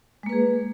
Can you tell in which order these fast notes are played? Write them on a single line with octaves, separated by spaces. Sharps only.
G#3 A#3 B4 G#4